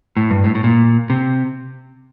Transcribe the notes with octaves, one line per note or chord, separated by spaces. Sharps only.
A2
G2
A2
A2
A#2
C3